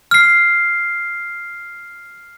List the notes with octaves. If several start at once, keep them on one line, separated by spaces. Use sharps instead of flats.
F6 C7